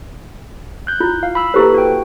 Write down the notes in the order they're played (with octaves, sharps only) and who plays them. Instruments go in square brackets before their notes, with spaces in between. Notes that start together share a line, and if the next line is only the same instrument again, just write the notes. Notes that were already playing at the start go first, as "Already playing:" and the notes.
[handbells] F#6 G6
[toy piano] E4 F4
[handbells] F5
B5 E6
[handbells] A#3 A4 B4 [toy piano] E4 G4 C5
[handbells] F#4 G5